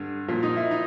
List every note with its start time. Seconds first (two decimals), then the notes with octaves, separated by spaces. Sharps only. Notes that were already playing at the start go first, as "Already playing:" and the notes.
Already playing: G2 D3
0.28 A#2 F3
0.43 D#4
0.56 E4
0.71 D#4